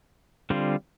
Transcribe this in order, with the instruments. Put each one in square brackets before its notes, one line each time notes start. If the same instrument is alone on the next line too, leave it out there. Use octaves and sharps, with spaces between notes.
[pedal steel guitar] D3 G3 C4 F4